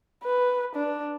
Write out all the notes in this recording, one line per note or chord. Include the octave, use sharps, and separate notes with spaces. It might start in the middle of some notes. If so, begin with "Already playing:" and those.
B4
D4